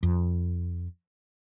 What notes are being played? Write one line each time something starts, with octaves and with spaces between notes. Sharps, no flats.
F2